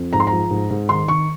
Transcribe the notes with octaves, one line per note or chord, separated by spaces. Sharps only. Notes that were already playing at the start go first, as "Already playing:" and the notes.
Already playing: F2
G#2 A#5
C6
A#5
F3
G#2
G#2
D#3 C6
D#3 C#6